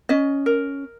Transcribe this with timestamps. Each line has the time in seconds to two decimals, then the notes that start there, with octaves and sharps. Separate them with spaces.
0.09 C#4 D#5
0.46 A#4